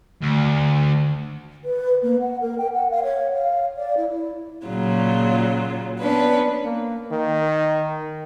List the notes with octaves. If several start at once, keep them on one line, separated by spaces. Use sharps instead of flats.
D2
B4
A#3
F#5
A#4
G5
F#5
F5
C#5
F5
D5
E4
E4
A#2 C#3 F#3 F4
B3 C#4 D4 B4
A#3
D#3